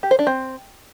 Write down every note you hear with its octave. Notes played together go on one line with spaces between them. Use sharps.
G4
C5
D4
C4